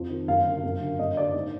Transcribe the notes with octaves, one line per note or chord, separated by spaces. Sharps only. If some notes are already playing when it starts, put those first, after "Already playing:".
Already playing: F2
D#3
F#2 F5
D3
F#2
D3
F#2 D#5
D3 D5
G#2